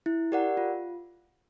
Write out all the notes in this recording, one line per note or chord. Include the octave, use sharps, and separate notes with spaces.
E4
G4 A#4 D5 F#5
F4